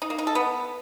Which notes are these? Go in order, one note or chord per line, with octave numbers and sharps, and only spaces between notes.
D#4
A#3
D#4
A4
B3